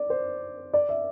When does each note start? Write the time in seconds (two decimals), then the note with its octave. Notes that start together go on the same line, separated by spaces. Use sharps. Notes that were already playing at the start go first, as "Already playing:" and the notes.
Already playing: D5
0.10 C5
0.73 D5
0.89 E5